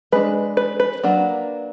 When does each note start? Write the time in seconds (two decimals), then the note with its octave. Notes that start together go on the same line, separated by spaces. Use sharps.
0.12 G#3 D4 B4
0.57 B4
0.80 B4
1.03 F#3 A#3 D4